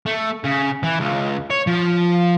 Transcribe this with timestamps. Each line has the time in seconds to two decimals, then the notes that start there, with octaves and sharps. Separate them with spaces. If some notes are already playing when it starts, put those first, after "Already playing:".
0.06 A3
0.44 C#3
0.83 E3
1.00 C#2
1.50 C#5
1.67 F3